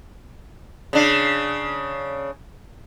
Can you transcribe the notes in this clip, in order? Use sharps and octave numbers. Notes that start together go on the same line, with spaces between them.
C#3 D4